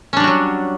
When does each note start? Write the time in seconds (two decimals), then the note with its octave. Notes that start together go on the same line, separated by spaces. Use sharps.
0.13 C#4
0.17 D4
0.20 G3
0.24 F#4
0.27 F#3